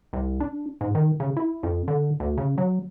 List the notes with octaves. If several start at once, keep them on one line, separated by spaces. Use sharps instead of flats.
C2
D4
G#2
D#3
C#3
E4
F2
D3
D2
C#3
F#3